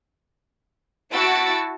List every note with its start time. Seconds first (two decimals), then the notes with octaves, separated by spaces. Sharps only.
1.12 E4 F#4 A5 E6 A6 D7